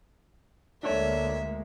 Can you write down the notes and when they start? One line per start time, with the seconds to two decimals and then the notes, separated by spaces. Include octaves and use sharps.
0.83 D2 G#3 A#3 D4 A4 C#5 E5